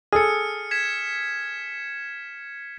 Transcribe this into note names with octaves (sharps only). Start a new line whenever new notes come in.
G#4 A4 F6 C#7
G#6 B6 E7